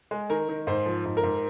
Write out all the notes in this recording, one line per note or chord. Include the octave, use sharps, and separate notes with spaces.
G#3
D#3 A#4
D#3
G#2 C5
F3
G#2
A#4
G#2